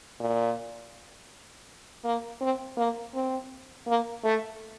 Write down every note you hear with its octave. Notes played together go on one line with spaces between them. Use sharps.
A#2
A#3
C4
A#3
C4
A#3
A3